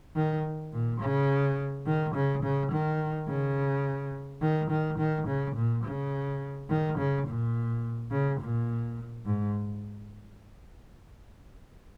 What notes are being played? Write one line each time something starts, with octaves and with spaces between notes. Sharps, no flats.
D#3
A#2
C#3
D#3
C#3
C#3
D#3
C#3
D#3
D#3
D#3
C#3
A#2
C#3
D#3
C#3
A#2
C#3
A#2
G#2